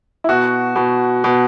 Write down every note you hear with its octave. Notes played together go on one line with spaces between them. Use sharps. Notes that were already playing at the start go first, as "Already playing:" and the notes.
E4
B2 F#4
B2
B2